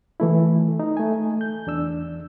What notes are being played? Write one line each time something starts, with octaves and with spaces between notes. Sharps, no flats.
E3 A3 E4
D#4
A3 G#5
G6
E2 D4 E6